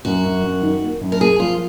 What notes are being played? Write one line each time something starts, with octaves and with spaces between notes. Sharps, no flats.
F#2 F#4
F#2
F#2
D#3
A#3
F#2
A#4
A#3 G#4
F3 F4